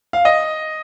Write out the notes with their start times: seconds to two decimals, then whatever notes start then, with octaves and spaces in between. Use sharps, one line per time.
0.13 F5
0.25 D#5